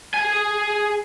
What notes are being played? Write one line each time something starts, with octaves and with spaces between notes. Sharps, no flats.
G#4 G#5